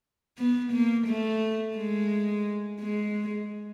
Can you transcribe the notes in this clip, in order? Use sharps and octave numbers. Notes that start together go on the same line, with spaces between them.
B3
A#3
A3
G#3
G#3